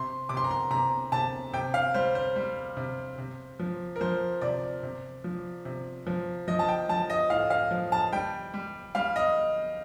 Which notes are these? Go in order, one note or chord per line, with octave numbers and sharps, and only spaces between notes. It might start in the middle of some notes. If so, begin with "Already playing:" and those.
Already playing: C3 C6
C3 D6
C6
A#5
C6
C3 A#5
C3 A5
C3 G5
F5
G3 C5
C5
G3
C3
C3
F3
A#4
F3 C5
C3 D5
C3
F3
C3
F3
F3 D#5
A5
G5
F3 A5
D#5
A2 F5
F5
F3
A5
G3 G5
G3
G3 F5
D#5